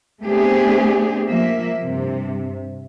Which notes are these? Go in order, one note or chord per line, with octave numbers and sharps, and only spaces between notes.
A3 B3 C4 D4 G4 G#4
F3 A#3 E5
G2 C3